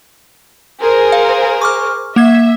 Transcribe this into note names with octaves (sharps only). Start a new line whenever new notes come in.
G#4 A#4 C5
F5
C#6 D6 F6
A#3 E5 G#6